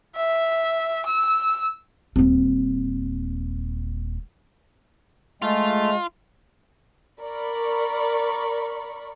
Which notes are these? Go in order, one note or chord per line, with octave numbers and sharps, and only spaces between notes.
E5
E6
D#1 C4
G#3 A3 F4
A#4 D5 B5 C#6